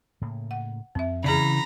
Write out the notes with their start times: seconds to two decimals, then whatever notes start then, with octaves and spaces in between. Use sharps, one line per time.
0.21 A2 C#3 A#3
0.51 F#5
0.95 F2 C4 E5
1.24 C#3 E3 G#4 D5 A#5 B5